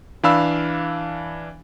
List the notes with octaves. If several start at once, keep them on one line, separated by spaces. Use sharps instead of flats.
E3 D4 F5 B5 E6